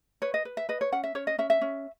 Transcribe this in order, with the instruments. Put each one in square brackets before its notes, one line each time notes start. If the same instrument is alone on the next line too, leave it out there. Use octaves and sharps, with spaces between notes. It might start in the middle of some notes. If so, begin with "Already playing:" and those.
[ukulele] B4 C#5
D#5
B4
E5
B4 D#5
C#5
C#4 F#5
E5
C#4 C#5
D#5
C#4 E5
E5
C#4